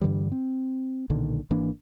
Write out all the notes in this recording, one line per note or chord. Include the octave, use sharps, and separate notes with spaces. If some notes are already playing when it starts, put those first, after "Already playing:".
G2 D3 E3 G3
C4
B1 A#2 D3 D#3
G#1 E3 A#3 D4